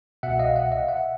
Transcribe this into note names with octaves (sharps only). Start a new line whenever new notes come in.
C2 B2 E5 F#5
D#5 F5
E5 F#5
D#5 F5
E5 F#5